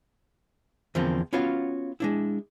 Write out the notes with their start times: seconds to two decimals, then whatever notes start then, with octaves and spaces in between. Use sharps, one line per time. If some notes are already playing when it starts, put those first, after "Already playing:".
0.95 E2 D3 F3 A#3 C4
1.33 B3 C#4 F4 F#4 C#5 F5
2.00 G#3 D4 E4